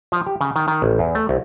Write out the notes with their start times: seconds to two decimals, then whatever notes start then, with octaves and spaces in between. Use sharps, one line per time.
0.12 F3
0.26 G4
0.41 C#3
0.56 D#3
0.68 D#3
0.82 A1
0.99 E2
1.15 A3
1.29 C2